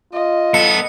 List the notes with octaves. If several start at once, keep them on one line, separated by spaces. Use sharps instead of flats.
F4 D#5
B3 A4 C#7